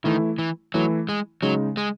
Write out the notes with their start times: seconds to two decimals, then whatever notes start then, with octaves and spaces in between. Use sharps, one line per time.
0.04 D#3 E3 A3 E4
0.39 E3
0.74 E3 F#3 A3 E4
1.09 G#3
1.42 C#3 F#3 G#3 D#4
1.77 G#3